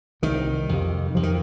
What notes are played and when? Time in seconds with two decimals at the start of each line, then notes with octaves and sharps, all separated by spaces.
0.22 C2 C3 D#3
0.69 F2 C3
1.15 F2 C3 F3
1.23 D#3